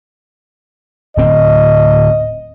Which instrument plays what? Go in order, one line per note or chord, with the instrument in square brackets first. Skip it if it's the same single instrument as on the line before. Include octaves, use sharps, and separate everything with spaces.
[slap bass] D1 C4 [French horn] D#5